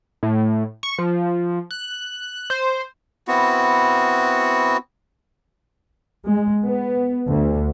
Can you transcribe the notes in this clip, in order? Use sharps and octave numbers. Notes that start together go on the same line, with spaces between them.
A2
C#6
F3
F#6
C5
B3 C4 E4 F#4
G#3
B3
D2